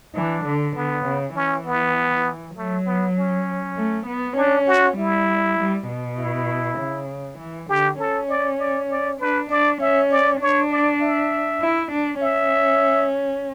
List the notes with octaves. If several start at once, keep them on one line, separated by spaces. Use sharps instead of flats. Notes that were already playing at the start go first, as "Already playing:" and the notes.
E3 D4
D3
D3 B3
C#3
E3 C#4
B3
F#3 A3
B3
C#4
A3
B3
C#4 D4
F#4
G3 E4
G3
B2
E4
C#3
E3
D3 G4
C#4 A4
D5
D5
D5
D4 B4
D4 D5
C#4 E5
D5
D4 C#5
D5
E5
E4
D4
C#4 E5